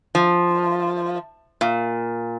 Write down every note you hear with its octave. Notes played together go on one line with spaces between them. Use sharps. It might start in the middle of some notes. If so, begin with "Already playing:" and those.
F3
A#2